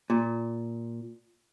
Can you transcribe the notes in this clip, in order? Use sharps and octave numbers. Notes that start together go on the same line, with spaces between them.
A#2